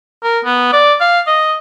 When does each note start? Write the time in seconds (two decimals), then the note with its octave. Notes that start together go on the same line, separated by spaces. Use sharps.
0.23 A#4
0.45 B3
0.72 D5
1.00 F5
1.27 D#5